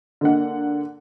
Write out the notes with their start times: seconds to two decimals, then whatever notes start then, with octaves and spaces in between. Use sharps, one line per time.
0.21 D3 A#3 F#5